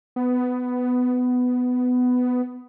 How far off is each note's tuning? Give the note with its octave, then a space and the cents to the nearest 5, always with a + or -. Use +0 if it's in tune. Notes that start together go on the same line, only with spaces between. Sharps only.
B3 +15